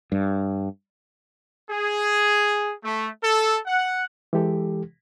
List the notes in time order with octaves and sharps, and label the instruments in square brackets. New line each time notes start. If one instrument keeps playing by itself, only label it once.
[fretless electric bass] G2
[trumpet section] G#4
A3
A4
F#5
[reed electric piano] E3 G#3 G4 A4